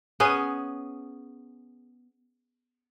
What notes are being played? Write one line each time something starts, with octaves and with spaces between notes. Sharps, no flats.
B3 C#4 G#4